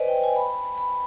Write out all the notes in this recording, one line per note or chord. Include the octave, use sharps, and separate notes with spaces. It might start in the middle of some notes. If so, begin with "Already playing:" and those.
Already playing: B4 C5 D5 D#5 G#5
G5
G#5
B5
B5